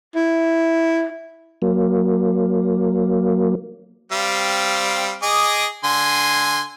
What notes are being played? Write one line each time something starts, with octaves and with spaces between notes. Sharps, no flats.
E4
F#3 A#3
G3 C4 F5
G#4 D#5 D6
D3 G#5 C6